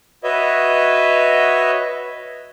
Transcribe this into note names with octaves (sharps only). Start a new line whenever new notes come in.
F#4 B4 C#5 D#5 E5